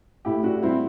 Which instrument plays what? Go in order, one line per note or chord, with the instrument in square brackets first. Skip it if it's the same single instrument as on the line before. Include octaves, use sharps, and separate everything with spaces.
[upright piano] A2 E4 G4
D4 F#4
G3 C4 E4